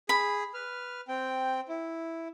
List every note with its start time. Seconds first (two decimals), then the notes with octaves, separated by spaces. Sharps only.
0.09 G#4 B5
0.54 B4 F6
1.08 C4 G5
1.69 E4